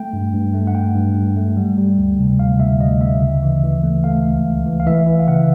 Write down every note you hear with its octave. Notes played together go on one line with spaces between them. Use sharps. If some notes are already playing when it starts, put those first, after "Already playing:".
Already playing: A3 G5
G2
G2
A3
F#5
A3 G5
G2
G2
A3
G3
G3
D2
C3
D2 F5
D2 E5
D2 D#5
D2 E5
C#3
E3
E3
A3
A3 F5
C#2
C#2
E3
F5
E3 E5
E3
F5
C#3 F#5